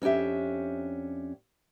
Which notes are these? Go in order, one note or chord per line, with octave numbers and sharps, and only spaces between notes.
F2 C#4 D4 G4 E5